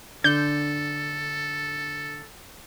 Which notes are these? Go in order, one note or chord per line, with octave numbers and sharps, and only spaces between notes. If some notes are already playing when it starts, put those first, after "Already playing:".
D3 A4 G6